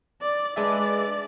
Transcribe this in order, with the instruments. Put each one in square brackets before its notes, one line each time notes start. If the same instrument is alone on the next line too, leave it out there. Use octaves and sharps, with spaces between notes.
[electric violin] D5
[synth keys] G#3 D4 G#4 B4 E5 [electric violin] D5